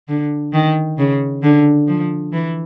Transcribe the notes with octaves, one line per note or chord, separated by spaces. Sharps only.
D3
D#3
C#3
D3
F3
E3